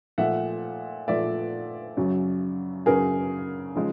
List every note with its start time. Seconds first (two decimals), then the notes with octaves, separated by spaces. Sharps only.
0.18 A#2 F3 A3 E5 F#5
1.08 A#2 F3 A3 D5 E5
1.97 F#2 C#3 F#3
2.86 F#2 C#3 F#3 G#4 A#4
3.76 C#3 F3 G#3